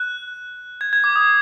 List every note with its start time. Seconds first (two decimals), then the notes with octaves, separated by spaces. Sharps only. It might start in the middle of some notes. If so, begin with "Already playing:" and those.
Already playing: F#6
0.81 G#6
0.93 G#6
1.04 D6
1.16 D#6